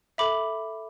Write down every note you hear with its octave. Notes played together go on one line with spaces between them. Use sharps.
A4 E5 B5 D6